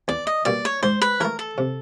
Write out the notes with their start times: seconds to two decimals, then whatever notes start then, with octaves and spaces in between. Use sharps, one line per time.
0.08 E2 D5
0.27 D#5
0.45 B2 G3 A#3 D5
0.65 C#5
0.83 G#2 C5
1.02 B4
1.20 E3 A3 A#4
1.39 A4
1.58 C3